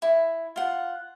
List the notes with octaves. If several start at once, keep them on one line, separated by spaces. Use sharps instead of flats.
E4
F4 F#5